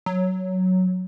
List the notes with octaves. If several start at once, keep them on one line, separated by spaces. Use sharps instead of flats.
F#3